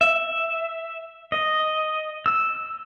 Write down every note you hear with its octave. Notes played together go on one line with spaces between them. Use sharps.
E5
D#5
E6